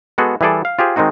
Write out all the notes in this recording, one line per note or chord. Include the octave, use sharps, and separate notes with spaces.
G#3 B3 F#4 G#4 A4
E3 G3 G#4 A4 D5
F5
F4 G4 G#4 C5
D#3 G#3 C4 D#4 F#4